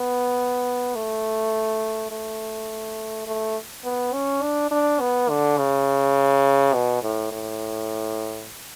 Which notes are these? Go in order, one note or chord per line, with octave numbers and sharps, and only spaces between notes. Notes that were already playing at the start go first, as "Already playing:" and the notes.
Already playing: B3
A3
A3
A3
B3
C#4
D4
D4
B3
D3
C#3
B2
A2
A2